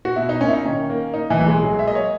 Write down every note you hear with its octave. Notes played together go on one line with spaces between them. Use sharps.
F#4
B2 E4
D#4
A#3 C#4
E4
D#4
D#3 C#4
A#3
A#3 D#4
E3 E4
B1
G#3 G#4
F#3
E5
A#3 D#5
C#5